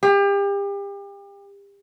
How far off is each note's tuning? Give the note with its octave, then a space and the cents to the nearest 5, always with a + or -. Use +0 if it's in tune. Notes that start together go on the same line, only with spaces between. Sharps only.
G4 +35